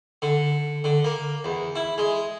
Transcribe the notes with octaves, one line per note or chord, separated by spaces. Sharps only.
D3
D3
A#3
E2
E4
G#3